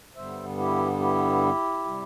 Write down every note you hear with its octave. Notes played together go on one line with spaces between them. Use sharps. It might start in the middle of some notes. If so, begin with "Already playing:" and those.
G2 D3 G3 B3 C5 E5
E4 G4
E4 G4
C3 G3